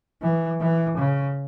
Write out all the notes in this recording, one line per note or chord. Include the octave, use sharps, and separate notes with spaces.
E3
E3
C#3